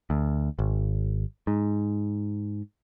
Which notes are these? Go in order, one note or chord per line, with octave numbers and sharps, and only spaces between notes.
D2
G#1
G#2